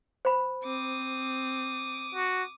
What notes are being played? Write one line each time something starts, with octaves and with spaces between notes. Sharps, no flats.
C5 B5
C4 D6 D#6
F#4